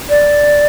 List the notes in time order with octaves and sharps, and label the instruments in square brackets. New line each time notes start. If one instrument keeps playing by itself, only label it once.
[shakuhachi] D5